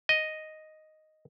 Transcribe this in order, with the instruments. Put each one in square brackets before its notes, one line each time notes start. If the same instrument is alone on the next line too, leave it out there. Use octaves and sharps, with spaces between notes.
[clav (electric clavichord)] D#5